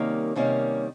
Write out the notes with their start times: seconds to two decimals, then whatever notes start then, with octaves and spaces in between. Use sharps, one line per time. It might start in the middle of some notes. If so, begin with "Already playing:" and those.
Already playing: C3 D#3 G3 A#3 C#4
0.36 C3 D#3 G3 A#3 C#4